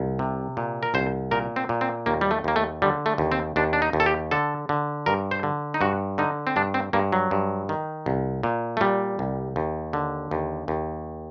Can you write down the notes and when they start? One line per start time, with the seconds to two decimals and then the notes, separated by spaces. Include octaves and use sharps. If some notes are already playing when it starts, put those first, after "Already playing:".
Already playing: C2
0.19 C3
0.57 A#2
0.83 A#4
0.94 C2 C5
1.31 A#2 A#4
1.56 C4
1.69 A#2
1.81 C4
2.06 D#2 A#3
2.21 G3
2.31 A3
2.44 D#2 A#3
2.56 A3
2.82 D3 G3
3.06 A3
3.18 D#2
3.32 C4
3.56 D#2 D4
3.73 D4
3.82 D#4
3.93 D#2
4.00 A4
4.06 G4
4.31 D3 A4
4.69 D3
5.06 G2 A#4
5.31 C5
5.43 D3
5.74 D#4
5.81 G2 F#4
6.18 D3 D#4
6.47 C4
6.56 G2 D4
6.74 C4
6.93 G2 A#3
7.13 F#3
7.31 G2
7.69 D#3
8.06 C2
8.43 A#2
8.77 A3
8.81 A#2 G3
9.19 C2
9.56 D#2
9.93 D3
10.31 D#2
10.68 D#2